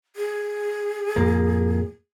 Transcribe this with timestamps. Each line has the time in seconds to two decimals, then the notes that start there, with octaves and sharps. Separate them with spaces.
0.16 G#4
1.16 F2 A2 A#3